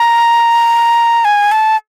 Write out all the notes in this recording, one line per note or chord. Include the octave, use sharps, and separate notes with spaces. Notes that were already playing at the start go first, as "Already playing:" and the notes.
Already playing: A#5
G#5
A5